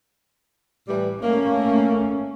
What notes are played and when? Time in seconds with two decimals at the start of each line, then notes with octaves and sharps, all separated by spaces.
0.88 A2 E3 G3
1.22 A3 A#3 C#4